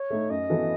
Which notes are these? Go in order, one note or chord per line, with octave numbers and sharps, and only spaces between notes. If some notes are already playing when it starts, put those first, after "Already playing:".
Already playing: C#5
A3 D#4
F#2 D#5
E3 B3 F#4 A4